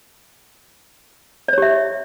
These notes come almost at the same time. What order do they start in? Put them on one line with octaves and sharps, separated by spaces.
D5 C#5 G4 E5